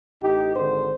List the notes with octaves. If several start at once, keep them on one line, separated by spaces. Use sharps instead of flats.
A1 D#4 G4
G#1 D3 C5